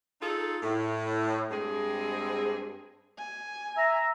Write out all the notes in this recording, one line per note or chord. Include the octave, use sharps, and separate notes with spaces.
D#4 F4 G#4 A4
A2
G2 G#3 C4 G#4
G#5
E5 A#5